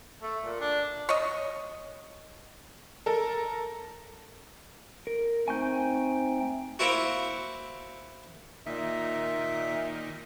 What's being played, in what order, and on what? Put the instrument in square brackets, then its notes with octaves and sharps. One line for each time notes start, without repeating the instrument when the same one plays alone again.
[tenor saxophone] A3
A#2
D4
[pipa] C#5 D#5
[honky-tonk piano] A4 A#4
[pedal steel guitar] A#4
[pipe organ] A3 D#4 G5 [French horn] C4 [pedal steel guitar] G#5 C#6 G6
[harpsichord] A#3 C4 E4 F#4
[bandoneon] A#2 E5 [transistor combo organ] D#3 A#3 D#4